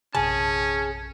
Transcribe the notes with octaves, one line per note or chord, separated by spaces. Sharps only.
A#1 F#2 C3 C#4 G#4 A5